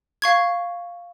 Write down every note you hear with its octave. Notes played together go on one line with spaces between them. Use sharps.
F5 C#6 G#6